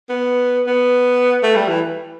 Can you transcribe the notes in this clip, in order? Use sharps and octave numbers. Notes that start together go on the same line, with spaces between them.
B3
B3
A3
G3
E3